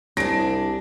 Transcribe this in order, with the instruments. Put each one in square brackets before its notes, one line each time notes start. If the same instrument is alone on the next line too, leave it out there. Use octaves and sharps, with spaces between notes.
[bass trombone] C2 [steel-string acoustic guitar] D4 G#4 [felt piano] A#6 D7